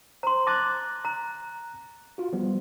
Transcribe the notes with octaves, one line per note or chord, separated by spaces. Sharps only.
C5 A#5 C6
A5 D6 F#6 A6 A#6
A#5
F4 F#4
F3 G3 B3